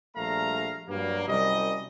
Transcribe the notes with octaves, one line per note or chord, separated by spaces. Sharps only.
A#1 G3 A3 F5 A#5
G2 F#3 G3 A#3
C2 F#2 G3 D#5